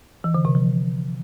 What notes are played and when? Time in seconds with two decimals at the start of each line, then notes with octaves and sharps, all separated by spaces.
0.24 E3
0.35 D3
0.45 C3
0.55 F3